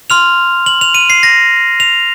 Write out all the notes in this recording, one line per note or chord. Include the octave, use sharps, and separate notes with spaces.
C6 F6 F7
F#7
F7
D#7
C7
A#6
F7